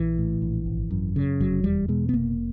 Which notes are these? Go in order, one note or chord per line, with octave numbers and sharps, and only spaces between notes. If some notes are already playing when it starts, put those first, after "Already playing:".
Already playing: A#1 E3
A2
A#1
G#1
F#2
C#3
F1 F#3
E2 G3
B2 G#3
B3
F1 A#3